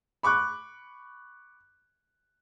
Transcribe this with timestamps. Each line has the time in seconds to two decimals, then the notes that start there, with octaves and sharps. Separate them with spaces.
0.23 B5 C#6 D6 F#6